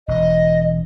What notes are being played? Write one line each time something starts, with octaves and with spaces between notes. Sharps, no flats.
E1 D#5